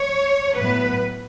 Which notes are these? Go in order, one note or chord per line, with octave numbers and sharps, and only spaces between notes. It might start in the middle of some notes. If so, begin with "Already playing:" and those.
Already playing: C#5
A2 F#3 B3 B4